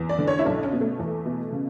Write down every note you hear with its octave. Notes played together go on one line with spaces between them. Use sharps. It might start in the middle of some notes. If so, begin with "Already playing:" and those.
Already playing: E2
D5
D3
C#5
E4
B1 D4
C#4
B2
A3
E2
B2
C#3